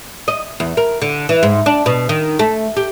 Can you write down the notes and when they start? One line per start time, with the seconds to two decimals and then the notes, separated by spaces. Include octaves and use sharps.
0.28 D#5
0.60 E2
0.77 A#4
1.02 D3
1.29 E3
1.43 G#2
1.66 D4
1.86 B2
2.09 D#3
2.39 A3
2.77 G4